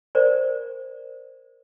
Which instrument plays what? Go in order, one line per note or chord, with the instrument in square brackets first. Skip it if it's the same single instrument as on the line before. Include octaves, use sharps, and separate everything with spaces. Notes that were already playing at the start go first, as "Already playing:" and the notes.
[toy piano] A#4 C5 D5